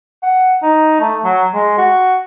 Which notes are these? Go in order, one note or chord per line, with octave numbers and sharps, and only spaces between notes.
F#5
D#4
A3
F#3
G#3
F#4